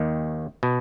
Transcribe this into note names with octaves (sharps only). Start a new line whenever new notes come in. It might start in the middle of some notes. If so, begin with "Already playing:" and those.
Already playing: D#2 D#3
B2